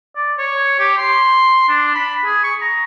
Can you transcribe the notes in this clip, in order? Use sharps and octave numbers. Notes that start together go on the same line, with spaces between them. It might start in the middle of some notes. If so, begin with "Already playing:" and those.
D5
C#5
G4
C6
D4
B5
G#4
C#6
A#5